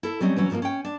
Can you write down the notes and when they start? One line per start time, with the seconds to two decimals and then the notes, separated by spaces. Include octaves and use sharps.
0.03 E4 A4
0.20 F#3 G3 C4 C#4 D#5
0.36 E3 F#3 C#4
0.50 G#2 F3 A3 A#3 F4
0.62 C#4 G5
0.85 D4